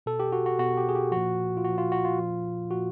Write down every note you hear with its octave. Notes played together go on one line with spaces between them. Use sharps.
B2 A4
G4
F#4
F#4
B2 F#4
G4
G#4
G4
A#2 F3 F#4
F4
A#2 F3 F#4
F4
F#4
F4
A#2 F3
A#2 F3 F#4